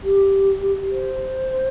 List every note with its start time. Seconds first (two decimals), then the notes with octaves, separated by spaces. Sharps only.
0.04 G4
0.91 C5